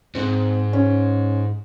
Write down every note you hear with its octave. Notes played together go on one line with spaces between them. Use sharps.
G#2 C4
C#4